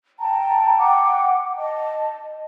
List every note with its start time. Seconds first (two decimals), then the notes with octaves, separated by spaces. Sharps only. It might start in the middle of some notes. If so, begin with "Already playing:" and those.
0.19 G5 A5 A#5
0.77 F#5 G5 D6
1.56 D#5 A5